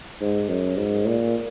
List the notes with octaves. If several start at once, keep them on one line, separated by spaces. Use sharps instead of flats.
G#2
F#2
G#2
A#2